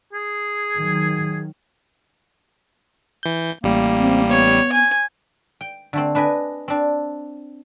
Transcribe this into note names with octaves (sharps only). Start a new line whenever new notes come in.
G#4
D#3 F#3
E3 G6
A1 G3 A#3
C4
B3 C#5
G#5
G5
D3 A3 C4
D4 B4 D#5 G#5 B5
C4 D4